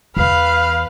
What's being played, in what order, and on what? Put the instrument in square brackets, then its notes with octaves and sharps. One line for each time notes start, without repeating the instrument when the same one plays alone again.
[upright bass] E2 [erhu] B4 [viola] F5